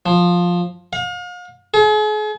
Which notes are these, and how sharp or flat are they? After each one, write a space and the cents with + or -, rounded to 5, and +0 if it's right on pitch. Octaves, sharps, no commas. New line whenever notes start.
F3 +10
F5 +40
G#4 +40